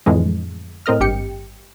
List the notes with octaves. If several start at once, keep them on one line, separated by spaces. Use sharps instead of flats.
F2 A2 D3 E3 G#3
A2 C4 A#4 D#5 F6
G#1 G2 G4 G5 C#7